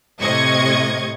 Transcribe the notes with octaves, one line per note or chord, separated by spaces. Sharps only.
A2 C3 D#5 C#6 G#6